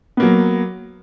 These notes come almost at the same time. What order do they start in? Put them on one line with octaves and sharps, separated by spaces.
B3 A#3 F#3